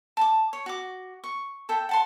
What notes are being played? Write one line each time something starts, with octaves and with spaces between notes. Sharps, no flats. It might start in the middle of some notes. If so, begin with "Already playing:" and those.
A5 D6
C#5
F#4 D6
C#6
A4 E5 G5
F#5 A5 C6